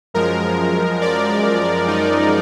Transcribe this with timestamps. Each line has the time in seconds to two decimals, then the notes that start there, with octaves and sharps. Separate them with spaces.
0.14 F#2 F3 G#3 A#4
1.01 D5
1.88 D#4